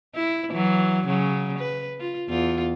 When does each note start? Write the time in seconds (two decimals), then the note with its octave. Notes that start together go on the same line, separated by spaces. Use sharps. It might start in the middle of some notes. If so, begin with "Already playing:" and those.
0.15 E4
0.50 E3 F#3
1.06 C#3 F#3
1.58 B4
2.00 F4
2.29 E2 F4